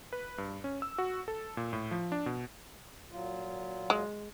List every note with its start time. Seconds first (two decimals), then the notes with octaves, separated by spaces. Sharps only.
0.13 B4
0.38 G2
0.64 C#4
0.82 E6
0.98 F#4
1.28 A4
1.57 A#2
1.73 A2
1.91 F3
2.12 D4
2.26 B2
3.10 A#2 F#3 F4
3.90 G#3